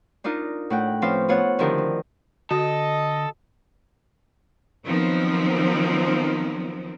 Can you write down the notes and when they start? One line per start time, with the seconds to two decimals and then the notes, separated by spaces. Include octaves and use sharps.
0.24 D4 D#4 F4 A#4 D#5
0.70 A2 F#5 G5
1.02 F3 C4 C#4 B4 C5 F5
1.28 B3 F4 A4 C5 C#5 F#5
1.58 D3 D#3 F3 E4 G4 A#4
1.78 C4
2.51 D3 F#4 A4 D#5
4.85 D#3 F3 F#3 B3 C4